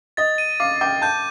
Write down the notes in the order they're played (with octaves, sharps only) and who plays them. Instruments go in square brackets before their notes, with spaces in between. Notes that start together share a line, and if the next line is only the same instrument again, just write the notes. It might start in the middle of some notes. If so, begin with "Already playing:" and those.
[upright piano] D#5 [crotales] A6
[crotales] D#7
[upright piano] F5 [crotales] D6
[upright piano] G5 [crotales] D6
[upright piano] A5 [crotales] G6